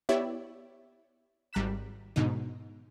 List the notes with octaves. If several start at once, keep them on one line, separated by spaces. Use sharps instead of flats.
B3 E4 G4 C#5 D5 E5
G#1 G3 A#5 F#6 B6 E7
G#2 B2 D3 D#4